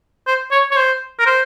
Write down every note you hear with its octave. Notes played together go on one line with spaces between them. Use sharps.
C5
C#5
C#5
C5
A#4
C5